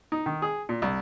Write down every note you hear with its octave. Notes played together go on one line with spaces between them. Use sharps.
D#4
D#3
G#4
A#2
C2